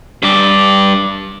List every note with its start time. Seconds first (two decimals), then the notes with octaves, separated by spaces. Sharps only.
0.23 G2 D5